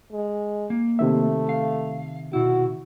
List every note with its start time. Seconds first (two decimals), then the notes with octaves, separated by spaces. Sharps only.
0.13 G#3
0.70 A#3
0.99 C3 D#3 A3 E5
1.49 F5
2.33 B2 E4 F#4